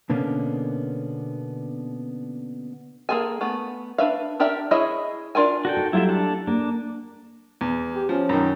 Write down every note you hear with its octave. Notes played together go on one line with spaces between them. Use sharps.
B2 D3 A#3 B3 C#4
A#3 D4 G#4 A4 G#5
A3 B3
D4 B4 E5 F5
D4 G4 A#4 D5 E5
E4 G#4 C#5 D#5 E5
D4 F4 A#4 G#5
F#4 A4 G5
D#4
F#3 G3 A3 E4 F4 E5
D4 A4
A#3 D4
E2
G4
F3 C#4
F#2 D#3